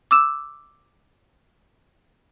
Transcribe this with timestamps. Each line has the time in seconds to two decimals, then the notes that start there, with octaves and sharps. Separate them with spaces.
0.11 D6 E6 E7